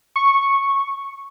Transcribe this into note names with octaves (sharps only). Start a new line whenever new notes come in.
C#6